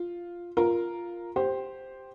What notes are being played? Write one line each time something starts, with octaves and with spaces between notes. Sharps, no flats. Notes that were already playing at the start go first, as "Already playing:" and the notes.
Already playing: F4
F4 A#4
G4 C5